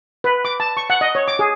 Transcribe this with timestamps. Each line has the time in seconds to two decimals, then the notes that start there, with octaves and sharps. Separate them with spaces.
0.24 B4
0.45 D6
0.60 A5
0.77 C#6
0.90 F#5
1.01 D#5
1.15 C#5
1.28 D6
1.39 G#4